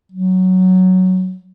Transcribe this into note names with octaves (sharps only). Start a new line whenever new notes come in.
F#3